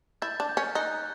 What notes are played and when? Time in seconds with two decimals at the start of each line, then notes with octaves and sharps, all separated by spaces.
0.22 E4 G6 A6
0.40 D4
0.49 G6
0.57 C#4
0.64 F6
0.75 D#4 F#6